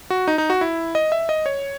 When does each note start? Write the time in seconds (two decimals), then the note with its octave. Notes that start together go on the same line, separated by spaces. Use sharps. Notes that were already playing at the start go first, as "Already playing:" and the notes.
0.10 F#4
0.28 D#4
0.38 D#4
0.50 F#4
0.61 E4
0.95 D#5
1.12 E5
1.29 D#5
1.46 C#5